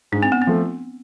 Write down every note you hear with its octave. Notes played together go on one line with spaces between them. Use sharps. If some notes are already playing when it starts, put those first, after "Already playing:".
G#2 D4
C4
B3
C4
F3 A3